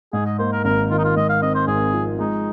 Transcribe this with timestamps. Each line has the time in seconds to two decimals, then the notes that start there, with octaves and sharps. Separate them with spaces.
0.13 G#2 G#4
0.26 D#5
0.39 A#3 C5
0.53 A#4
0.65 G#1 A#4
0.90 D#3 F4
0.98 D#4
1.04 F4
1.16 G#2 D#5
1.29 F5
1.42 C4 D#5
1.55 C5
1.67 G#1 G#4
1.93 F3
2.19 G#3 D#4